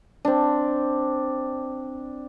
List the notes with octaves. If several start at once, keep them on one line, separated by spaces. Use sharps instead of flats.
C4 D4